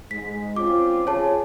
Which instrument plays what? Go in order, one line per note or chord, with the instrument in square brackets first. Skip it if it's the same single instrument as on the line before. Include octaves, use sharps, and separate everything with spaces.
[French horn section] G#2 G#3 [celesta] B6
[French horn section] C4 C#4 F4 [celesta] D6
[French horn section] F4 G#4 [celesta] C#5 A5